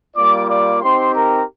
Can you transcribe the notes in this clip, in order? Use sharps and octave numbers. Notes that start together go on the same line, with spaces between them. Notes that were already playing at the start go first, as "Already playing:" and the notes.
G3 A#3 F4 D5 D6
D5 D6
C4 D#4 G4 C5 C6
A#4 A#5